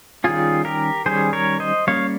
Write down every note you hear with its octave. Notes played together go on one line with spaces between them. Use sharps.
D#3 G3 C#4 F4 G#4
G4 A#4
D#3 G3 C#4 G#4 C5
A#4 C#5
C5 D#5
G3 A#3 C#4 C#5 F5